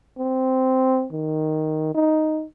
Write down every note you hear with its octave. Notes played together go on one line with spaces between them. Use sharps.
C4
D#3
D#4